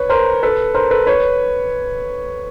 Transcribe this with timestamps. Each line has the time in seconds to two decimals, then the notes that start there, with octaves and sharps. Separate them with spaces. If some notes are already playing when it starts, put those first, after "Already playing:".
Already playing: B4 C#5
0.10 A#4 C5
0.43 A4 B4
0.75 A#4 C5
0.91 A4 B4
1.07 B4 C#5